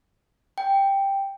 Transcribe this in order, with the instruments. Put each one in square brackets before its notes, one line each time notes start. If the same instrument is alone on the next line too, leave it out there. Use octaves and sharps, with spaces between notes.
[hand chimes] G5